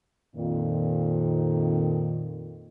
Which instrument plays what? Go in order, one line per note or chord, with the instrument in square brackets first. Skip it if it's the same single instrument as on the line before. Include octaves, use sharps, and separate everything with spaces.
[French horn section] F2 A#2 D#3